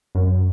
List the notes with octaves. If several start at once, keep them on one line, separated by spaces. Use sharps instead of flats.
F#2